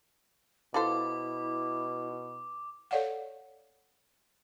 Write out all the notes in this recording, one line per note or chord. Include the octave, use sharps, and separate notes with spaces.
B2 E4 F4 A4 C5 D6
A4 C#5 D5 F5 F#5